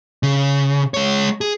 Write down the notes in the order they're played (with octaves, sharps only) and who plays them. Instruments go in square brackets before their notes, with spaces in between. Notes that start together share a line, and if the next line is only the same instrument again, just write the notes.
[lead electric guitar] C#3
G#3 C#5
G#4